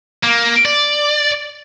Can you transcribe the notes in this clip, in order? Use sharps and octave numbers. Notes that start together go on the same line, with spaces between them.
A#3
D5